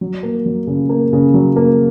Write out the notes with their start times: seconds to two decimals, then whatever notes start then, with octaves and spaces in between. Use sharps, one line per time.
0.01 F#3
0.23 A#3
0.46 F#3
0.67 C#3
0.89 A#3
1.13 C#3
1.34 F#3
1.56 A#3